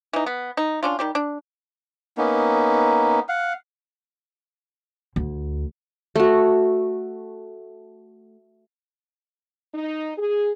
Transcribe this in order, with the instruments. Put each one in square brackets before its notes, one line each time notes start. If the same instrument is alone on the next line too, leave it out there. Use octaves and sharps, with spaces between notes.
[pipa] E3 D#4
B3
D#4
C#4 D4 F4
D#3 G3 G4
D4
[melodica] A#3 B3 C#4 D#4
F5 F#5
[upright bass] D2
[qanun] A3 F#4
[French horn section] D#4
G#4